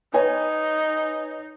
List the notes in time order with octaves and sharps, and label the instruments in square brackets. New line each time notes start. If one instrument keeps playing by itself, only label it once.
[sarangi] D#4 [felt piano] B4 C#5 G#5